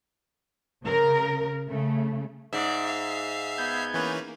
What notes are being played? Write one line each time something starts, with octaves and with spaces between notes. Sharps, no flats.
C#3 A#4
C#3 A3
G#2 D5 E5 C7
F5
B3 G6 G#6
E3 A#3 C#4 B4